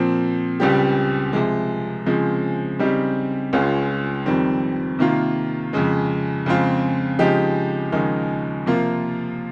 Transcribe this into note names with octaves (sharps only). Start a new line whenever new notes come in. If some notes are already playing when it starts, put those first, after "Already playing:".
Already playing: A#2 F3 C4
C#2 C#3 G3 C4 G4
C3 F3 G#3
C#3 F3 G#3 C4
C#3 G3 C4 D#4 G4
C#2 C#3 G#3 C#4 F4
F2 D#3 G3 C4
C3 D#3 A#3 F4
F2 C#3 G#3
F2 C#3 G#3 C4 F4
C#3 F3 G#3 D#4 G4
D#2 C#3 F3 G#3 D#4
C3 F3 A#3 F4